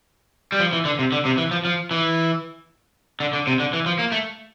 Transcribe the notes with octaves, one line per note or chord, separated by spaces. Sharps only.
G3
F3
E3
D3
C3
D3
C3
E3
F3
F3
E3
D3
D3
C3
D3
E3
F3
A#3
A3